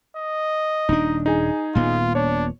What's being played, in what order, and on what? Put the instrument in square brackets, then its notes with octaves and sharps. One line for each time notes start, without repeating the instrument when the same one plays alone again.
[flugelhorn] D#5
[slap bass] D#1 D4 [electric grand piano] D#4
[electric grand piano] D#4 G#4 G#5
[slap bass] D#1 A#2 B3 [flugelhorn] F4
[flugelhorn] D4 [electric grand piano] C#5